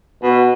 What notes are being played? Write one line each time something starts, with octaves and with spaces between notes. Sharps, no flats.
B2